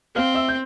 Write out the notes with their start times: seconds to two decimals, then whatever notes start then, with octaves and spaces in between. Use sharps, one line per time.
0.15 C4 F5 F6
0.35 E5 E6
0.48 G6